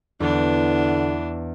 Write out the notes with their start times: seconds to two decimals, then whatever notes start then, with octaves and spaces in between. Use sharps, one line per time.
0.20 E2 D3 B3 D4